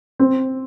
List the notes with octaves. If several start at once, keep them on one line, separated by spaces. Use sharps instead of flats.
C4